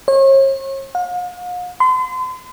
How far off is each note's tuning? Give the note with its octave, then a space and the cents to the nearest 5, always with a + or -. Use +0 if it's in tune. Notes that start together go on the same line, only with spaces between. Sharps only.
C#5 -40
F5 +45
C6 -40